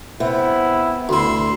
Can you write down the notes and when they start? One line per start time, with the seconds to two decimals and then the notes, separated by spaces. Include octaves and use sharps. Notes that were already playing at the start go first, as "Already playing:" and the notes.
0.20 C3 B3 E4
1.09 D2 E4 C6